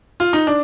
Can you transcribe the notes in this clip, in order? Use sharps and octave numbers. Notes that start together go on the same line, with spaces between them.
F4
D#4
D4